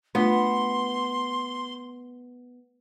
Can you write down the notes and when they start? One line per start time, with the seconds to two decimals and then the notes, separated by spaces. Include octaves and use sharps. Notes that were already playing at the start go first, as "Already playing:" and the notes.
0.15 A3 B3 D4 F4 C6